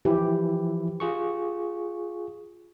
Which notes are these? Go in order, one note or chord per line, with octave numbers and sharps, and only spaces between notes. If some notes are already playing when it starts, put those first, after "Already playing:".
E3 F3 E4 G4
F4 G#4 C#6